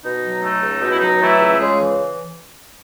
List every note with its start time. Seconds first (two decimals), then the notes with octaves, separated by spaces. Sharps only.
0.04 B2 D#4
0.24 F#3
0.43 A3 D#4
0.62 C#2
0.82 B2 D#4
0.90 E4
0.99 F#3 D#4
1.21 E3 A3 E4
1.40 C#2
1.59 C#3 G#3 G#4
1.79 E3